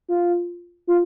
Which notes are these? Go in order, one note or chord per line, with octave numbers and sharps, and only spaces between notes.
F4
F4